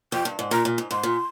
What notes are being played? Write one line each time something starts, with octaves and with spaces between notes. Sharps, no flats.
F2 G5
G2
G#2
A#2 A#5
A#2
G#2
G#2 C6
A#2